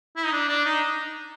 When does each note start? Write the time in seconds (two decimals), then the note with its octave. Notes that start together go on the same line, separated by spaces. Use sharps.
0.17 E4
0.25 D#4
0.33 D4
0.49 D4
0.65 D#4